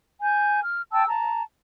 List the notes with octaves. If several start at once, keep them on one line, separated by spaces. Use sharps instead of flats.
G#5 G6
F6
G5 A5 E6
A5 A#5